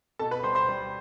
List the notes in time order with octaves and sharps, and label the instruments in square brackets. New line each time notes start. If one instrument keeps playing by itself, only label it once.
[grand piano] B2 A4 A5
B4 B5
G3 C5 C6
C5 C6
G3